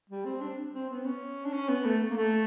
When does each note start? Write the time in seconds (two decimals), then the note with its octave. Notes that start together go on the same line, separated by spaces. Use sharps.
0.10 G3
0.25 C4
0.41 D4
0.73 C4
0.89 B3
1.05 C#4
1.45 D4
1.53 C#4
1.69 B3
1.85 A3
2.10 A#3
2.17 A3